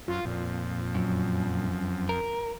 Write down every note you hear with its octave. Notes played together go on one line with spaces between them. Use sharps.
F#2 F4
F2 A#2
F#2
A#4